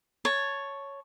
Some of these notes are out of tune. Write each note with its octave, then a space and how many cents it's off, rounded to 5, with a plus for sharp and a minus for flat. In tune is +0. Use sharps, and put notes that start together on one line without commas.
C#5 +0 A5 +0